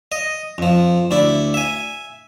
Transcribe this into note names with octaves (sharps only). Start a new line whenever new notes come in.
D#5
F2 F3
D2 E4 D5
E5 G#5